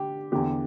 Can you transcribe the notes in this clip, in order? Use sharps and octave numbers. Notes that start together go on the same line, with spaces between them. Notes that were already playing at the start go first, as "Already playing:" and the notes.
Already playing: D3 G4
E2 D3 G4